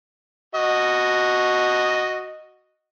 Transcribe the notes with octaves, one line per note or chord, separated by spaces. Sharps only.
F#4 D#5